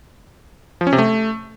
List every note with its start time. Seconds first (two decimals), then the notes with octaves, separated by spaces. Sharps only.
0.81 F3
0.87 C#4
0.93 C3
0.98 A3